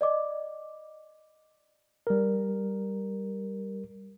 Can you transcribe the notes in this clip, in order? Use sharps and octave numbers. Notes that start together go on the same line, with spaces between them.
D5 D#5 D6
G3 A#4